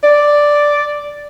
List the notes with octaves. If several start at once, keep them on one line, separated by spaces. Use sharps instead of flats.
D5